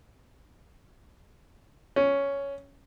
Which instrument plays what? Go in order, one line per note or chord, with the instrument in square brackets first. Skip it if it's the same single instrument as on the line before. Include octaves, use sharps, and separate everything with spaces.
[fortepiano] C#4